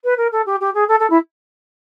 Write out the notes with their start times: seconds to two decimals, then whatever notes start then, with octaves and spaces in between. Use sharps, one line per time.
0.04 B4
0.17 A#4
0.32 A4
0.46 G4
0.60 G4
0.74 G#4
0.88 A4
0.99 A4
1.10 E4